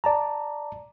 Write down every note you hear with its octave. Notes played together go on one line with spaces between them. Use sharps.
D5 A5 A#5